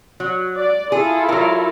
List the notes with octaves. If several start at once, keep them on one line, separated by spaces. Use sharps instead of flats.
F#3
D5
E4 F4 G#4 A4
F#3 A#4